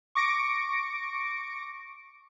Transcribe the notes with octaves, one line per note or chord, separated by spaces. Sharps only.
C#6 D6 A#6 C#7 D7